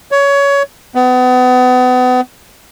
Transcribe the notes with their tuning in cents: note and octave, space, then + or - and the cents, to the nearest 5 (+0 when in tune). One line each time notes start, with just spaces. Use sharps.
C#5 +20
B3 +35